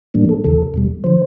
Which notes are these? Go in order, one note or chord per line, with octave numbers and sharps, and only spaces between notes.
A2 E3 G3 A#3 D4
A4
E2 C#3 E3 A4
E2 B2 G3
D3 F3 C5